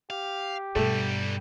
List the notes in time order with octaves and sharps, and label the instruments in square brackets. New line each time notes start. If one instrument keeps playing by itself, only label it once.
[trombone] G4 [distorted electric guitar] F5
[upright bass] G2 B2 [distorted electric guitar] D3 G3 [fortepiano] A3